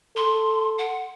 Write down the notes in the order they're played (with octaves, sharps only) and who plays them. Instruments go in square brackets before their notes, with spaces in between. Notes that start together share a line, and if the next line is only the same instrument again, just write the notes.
[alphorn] A4 [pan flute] C6
[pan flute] F#5